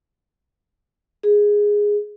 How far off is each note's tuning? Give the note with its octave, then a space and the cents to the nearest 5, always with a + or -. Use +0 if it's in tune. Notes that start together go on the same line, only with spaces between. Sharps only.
G#4 -5